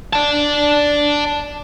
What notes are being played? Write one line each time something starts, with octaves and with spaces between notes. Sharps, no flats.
D5 A5